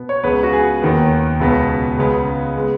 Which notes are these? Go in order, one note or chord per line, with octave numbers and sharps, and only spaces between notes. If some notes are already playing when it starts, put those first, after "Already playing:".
Already playing: B2 B3
C#5
C#2 C#3 B3 B4
F#4
G#4
D#2 D#3 B3
C#2 B2 B3
C#2 C#3 G#3 B3
G#3 B3